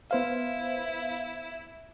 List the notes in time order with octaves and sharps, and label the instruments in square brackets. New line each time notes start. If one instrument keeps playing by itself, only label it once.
[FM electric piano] B3 C5 F5 [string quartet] E4